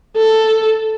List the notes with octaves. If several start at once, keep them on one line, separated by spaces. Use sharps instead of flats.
A4